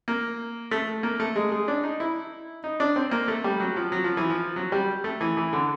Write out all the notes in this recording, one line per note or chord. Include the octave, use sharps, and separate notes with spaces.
A#3
A3
A#3
A3
G#3
G#3
D4
D#4
E4
D#4
D4
C4
A#3
A3
G3
F#3
F3
F#3
F3
E3
F3
F#3
G3
A3
E3
E3
D3